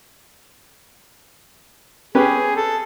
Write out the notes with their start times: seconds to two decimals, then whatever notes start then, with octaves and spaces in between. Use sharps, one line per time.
2.15 C#4 G4 G#4 B4
2.56 A4